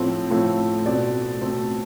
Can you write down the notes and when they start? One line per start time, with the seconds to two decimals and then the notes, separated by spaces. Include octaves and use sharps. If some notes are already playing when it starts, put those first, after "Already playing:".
Already playing: A2 F3 A3 C4
0.30 A2 F3 A3 C4
0.86 B2 A3 C4 D5
1.41 B2 A3 C4